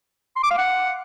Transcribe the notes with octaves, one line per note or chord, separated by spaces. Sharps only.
C6
D6
F5
F#5